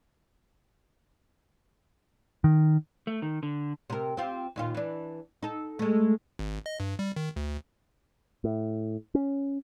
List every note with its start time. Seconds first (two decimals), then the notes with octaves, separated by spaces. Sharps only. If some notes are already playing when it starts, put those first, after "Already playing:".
2.44 D#3
3.07 A3
3.22 D#3
3.43 D3
3.90 C3 A#4
4.17 C4 F4 G4
4.56 D#2 A#2 F4
4.74 E3 D4
5.43 D#4 A4
5.79 G#3 A3
6.39 G#1
6.66 D#5
6.80 G2
6.99 G3
7.16 D#3
7.36 D2
8.44 A2
9.15 C#4